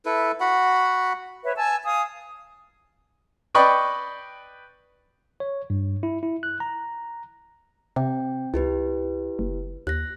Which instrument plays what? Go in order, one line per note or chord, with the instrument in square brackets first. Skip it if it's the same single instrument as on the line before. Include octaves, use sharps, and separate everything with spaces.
[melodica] E4 A4 B4
F#4 F#5 B5
[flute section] B4 C#5 E5
G#5 A5 E6
F5 G#5 D#6
[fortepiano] B4 D5 D#5 G5 B5 C#6
[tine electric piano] C#5
G2
E4
E4
F#6
A#5
[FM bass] C3 [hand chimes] C4 G5
[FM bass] C#2 [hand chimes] E4 G4 B4
[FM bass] F#1
[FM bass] D#2 [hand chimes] F#6 A#6